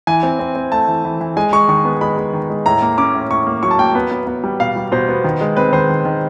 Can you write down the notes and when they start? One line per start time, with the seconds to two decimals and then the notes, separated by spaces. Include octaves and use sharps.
0.07 E3 G#5
0.23 C4
0.39 C4
0.56 C4
0.72 A3 A5
0.88 E3
1.05 E3
1.20 E3
1.37 G#3 G#5
1.53 G#3 C#6
1.68 D#3 C#6
1.85 B3
2.01 G#3 B5
2.17 G#3
2.33 D#3
2.50 G#3
2.66 A2 A#5
2.82 A#3
2.98 C#4 D6
3.14 A2
3.31 A2 C#6
3.47 A#3
3.63 F#3 C#6
3.71 A5
3.79 A#3 G5
3.95 B3
4.11 B3
4.27 B3
4.44 G3
4.60 B2 F5
4.76 G3
4.92 B2 C5
5.08 B3
5.24 D#3
5.41 G#3
5.57 C4 B4
5.73 D#3 C5
5.89 D#3
6.05 D#3